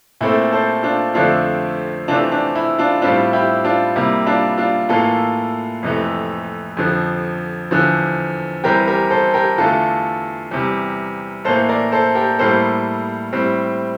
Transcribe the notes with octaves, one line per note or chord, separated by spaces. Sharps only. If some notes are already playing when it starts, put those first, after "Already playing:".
A#2 A3 C4 E4
A4 C5
D4 F4
F2 D3 A3 C4 D4 F4
C3 E3 A3 C4 D4 F4
D4
E4
D4 F4
A2 G3 C4 D4 F4
E4 G4
D4 F4
C3 G3 A#3 E4
D4 F4
D4 F4
A2 E3 A#3 F4 A4
F2 C3 E3 A3
F2 D3 F3
E2 D3 F3
E2 E3 G3 C4 G4 A#4
G4 A#4
A4 C5
G4 A#4
E2 D3 A3 F4 A4
E2 C3 G3
A2 E3 A#3 A4 C5
A#4 D5
A4 C5
G4 A#4
A2 G3 A#3 A4 C5
A2 G3 C4